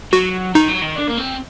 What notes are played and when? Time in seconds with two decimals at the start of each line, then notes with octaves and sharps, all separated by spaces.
0.13 F#3 F#4
0.54 D#3 D#4
0.68 F#3
0.81 D#3
0.96 D4
1.07 A#3
1.18 C4